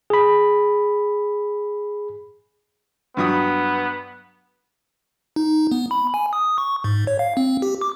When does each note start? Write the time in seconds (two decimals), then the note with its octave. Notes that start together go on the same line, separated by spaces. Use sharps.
0.10 G#4 B5
3.17 G2 F#3 B3 D#6
5.36 D#4
5.72 B3
5.91 B5
6.14 G#5
6.33 D#6
6.58 C#6
6.84 G#2
7.07 C#5
7.19 F5
7.37 C4
7.62 G4
7.81 D6